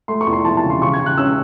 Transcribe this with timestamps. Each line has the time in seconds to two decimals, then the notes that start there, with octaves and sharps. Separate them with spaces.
0.08 A3 C6
0.21 C#6
0.27 E2
0.33 C6
0.45 E3 A5
0.57 A5
0.64 C#3
0.70 C6
0.81 C#3 C#6
0.93 G#6
0.99 C#3
1.06 F#6
1.18 C#4 E6